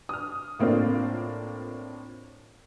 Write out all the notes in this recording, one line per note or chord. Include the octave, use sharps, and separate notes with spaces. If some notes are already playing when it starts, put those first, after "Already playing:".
D#6 F6
A2 A#3 C4 D4 F4